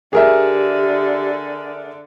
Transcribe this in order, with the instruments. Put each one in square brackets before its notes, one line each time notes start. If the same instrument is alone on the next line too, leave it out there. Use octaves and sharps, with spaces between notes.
[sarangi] D3 [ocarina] G4 [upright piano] G#4 A#4 E5